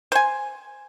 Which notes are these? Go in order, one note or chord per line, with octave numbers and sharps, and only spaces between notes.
C5 G#5